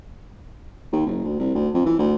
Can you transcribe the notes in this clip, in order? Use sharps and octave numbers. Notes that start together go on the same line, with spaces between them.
D#2
F#1
D2
C2
D2
F2
E3
D2